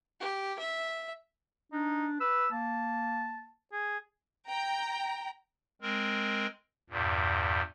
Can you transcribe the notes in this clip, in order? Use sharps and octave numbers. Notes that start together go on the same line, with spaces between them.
G4
E5
D4 D#4
B4 E6
A#3 A5
G#4
G5 A#5
G#3 C4 A#4
E2 G2 A#2